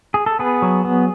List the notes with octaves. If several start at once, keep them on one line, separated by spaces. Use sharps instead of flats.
G#4
A4
B3 G#4 B4
F#3
B3